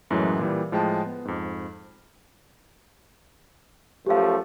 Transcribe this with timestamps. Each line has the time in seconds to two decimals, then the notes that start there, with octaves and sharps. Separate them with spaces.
0.10 F#2 A2 E3 F#3 G#3
0.39 A#2 E3 G3
0.72 A2 F3 G#3 G5 A5
1.06 B3
1.25 F2 G#2
4.06 F#2 F3 A3 G4 F5